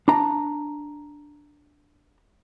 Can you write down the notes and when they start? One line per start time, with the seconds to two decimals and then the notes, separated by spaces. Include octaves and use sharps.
0.08 D4 A#5